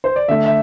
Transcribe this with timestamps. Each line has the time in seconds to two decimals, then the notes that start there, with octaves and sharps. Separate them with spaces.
0.04 C5
0.16 D5
0.28 D3 A3 E5
0.46 E5